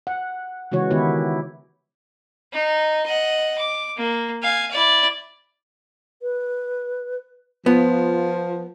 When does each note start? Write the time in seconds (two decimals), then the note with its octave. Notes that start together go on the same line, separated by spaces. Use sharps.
0.07 F#5
0.72 C#3 E3 G#3 F#4 C#5
0.91 D#3 B3 E4 G4 C#5
2.53 D#4
3.06 D#5 F#5
3.58 D6
3.97 A#3
4.43 F5 G#5
4.71 E4 D5
6.22 B4
7.66 F3 B3 F4